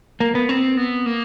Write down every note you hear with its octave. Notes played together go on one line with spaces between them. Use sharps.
A#3
B3
C4
B3
A#3